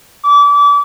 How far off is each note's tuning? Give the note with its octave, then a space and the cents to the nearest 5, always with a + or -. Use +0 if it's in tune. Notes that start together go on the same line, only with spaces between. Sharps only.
D6 -30